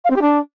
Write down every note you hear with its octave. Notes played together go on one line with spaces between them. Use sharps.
F5
C4
G4
D4